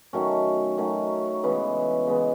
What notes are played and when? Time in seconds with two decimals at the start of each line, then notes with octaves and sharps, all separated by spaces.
0.13 D#3 F#3 A3 C#4
0.78 D#3 F#3 A3 C#4
1.43 C#3 E3 G#3 B3
2.07 C#3 E3 G#3 B3